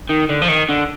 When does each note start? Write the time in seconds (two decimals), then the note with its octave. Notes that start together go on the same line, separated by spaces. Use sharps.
0.09 D#3
0.29 D3
0.42 F3
0.48 D#3
0.69 D3